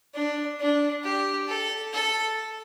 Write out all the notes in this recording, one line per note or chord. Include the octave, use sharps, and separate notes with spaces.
D4
D4
G4
A4
A4